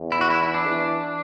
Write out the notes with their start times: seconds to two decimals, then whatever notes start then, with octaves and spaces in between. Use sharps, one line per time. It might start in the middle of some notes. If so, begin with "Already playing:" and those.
Already playing: E2
0.12 E4
0.21 F#4
0.30 E4
0.43 E4
0.54 D4
0.67 E3